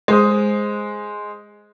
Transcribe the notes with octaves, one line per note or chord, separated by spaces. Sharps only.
G#3 C5 D#6